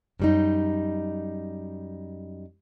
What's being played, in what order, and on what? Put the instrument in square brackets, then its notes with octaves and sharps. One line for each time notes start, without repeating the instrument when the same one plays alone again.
[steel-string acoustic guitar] F#2 G3 D#4